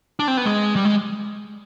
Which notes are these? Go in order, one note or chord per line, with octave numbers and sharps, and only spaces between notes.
D4
C4
B3
G#3
G3
G#3